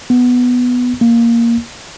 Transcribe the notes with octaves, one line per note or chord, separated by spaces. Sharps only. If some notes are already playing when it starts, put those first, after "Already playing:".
B3
A#3